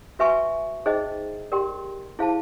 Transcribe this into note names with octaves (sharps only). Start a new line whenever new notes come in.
F#4 B4 E5 G#5 C#6
D#4 G#4 C5 D#5 G5
G4 A#4 D5 G5 C6
E4 G#4 C5 F5 A5